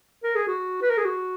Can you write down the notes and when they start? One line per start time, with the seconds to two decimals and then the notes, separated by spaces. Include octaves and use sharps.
0.23 A#4
0.35 G#4
0.47 F#4
0.82 B4
0.90 A#4
0.97 G#4
1.05 F#4